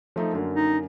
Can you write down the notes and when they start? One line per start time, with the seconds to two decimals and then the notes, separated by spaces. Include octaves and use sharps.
0.16 F3 A3 D#4
0.33 F#2 D3 A#3
0.54 D#4